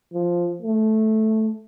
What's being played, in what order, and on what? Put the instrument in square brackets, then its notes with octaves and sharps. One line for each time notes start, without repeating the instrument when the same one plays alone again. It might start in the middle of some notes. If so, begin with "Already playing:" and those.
[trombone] F3
A3